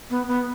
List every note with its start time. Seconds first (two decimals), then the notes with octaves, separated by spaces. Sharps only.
0.10 B3
0.28 B3